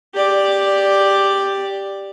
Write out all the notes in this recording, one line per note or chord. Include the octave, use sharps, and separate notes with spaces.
G4 D5